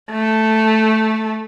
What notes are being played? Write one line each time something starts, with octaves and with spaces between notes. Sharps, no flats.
A3